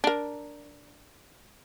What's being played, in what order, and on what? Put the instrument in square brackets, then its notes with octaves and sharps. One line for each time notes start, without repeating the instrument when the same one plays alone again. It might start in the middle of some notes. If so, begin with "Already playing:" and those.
[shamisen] D4 A#4